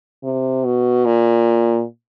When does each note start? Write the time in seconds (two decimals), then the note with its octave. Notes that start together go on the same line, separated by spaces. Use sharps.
0.24 C3
0.65 B2
1.05 A#2